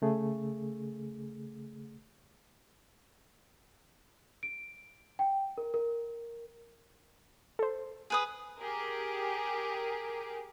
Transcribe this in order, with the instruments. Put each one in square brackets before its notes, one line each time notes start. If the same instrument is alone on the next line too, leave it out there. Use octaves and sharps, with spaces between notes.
[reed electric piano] C#3 A3 G#4
[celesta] D7
G5
A#4
A#4
[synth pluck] A4 C5
[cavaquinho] G#4 B4 D#6
[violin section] G4 G#4 A#4